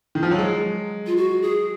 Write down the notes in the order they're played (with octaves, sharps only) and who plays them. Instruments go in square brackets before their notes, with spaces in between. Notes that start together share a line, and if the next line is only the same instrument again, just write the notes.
[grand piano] D#3
F3
F#3
G#3
[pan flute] F4
F#4
G#4